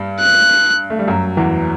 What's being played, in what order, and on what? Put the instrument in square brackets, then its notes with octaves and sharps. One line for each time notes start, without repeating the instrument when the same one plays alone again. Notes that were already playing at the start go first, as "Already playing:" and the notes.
Already playing: [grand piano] G2 G3
[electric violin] F#6
[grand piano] A3
G3
F#2 F#3
E2 E3